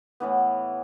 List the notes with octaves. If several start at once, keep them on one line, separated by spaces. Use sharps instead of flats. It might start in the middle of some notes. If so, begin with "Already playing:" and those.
A2 E3 B3